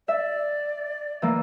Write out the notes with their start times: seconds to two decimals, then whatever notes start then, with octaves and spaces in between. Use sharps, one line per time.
0.08 D5 E5
1.22 E3 A#3